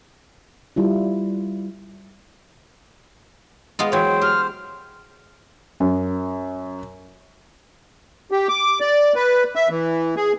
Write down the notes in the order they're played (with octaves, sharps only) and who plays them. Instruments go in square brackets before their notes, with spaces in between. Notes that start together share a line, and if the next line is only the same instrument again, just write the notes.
[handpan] G3 E4 F4
[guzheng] G#3 B3 F4 [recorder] D#5
[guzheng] E3 C#5 [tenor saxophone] F#3 [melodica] C5 [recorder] G5
[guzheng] G4 [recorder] F6
[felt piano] F#2
[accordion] G4
D6
D5
B4
E5
E3
G#4